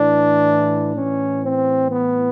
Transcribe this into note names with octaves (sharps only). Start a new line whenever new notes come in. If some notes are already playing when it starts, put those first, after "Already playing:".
Already playing: A2 E3 D4
A2 E3 C#4
C4
B3